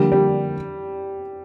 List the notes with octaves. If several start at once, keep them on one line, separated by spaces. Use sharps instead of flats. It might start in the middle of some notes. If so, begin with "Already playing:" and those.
Already playing: D3 F3 G3 A#3
G3